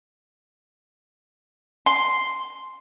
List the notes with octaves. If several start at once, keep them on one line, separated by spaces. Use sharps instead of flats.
C6